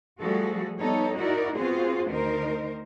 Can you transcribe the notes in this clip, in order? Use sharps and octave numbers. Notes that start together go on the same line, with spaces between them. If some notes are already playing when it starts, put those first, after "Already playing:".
F3 G3 A3 F#4 G#4 A4
G3 B3 D#4 A4 C#5
D#4 E4 F#4 A#4 D5
B3 C4 F4 F#4 G#4 C5
D2 D#3 D#4 A#4 C5